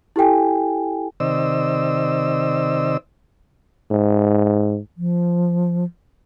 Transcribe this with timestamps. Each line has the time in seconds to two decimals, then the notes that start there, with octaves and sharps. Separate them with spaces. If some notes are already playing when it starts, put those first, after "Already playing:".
0.16 E4 G4 A4 G5 G#5
1.20 C3 D#3 C5 D5 D#5 E6
3.91 G#2
4.97 F3